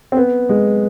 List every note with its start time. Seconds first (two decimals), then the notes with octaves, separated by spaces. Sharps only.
0.12 C4
0.17 B3
0.49 G#3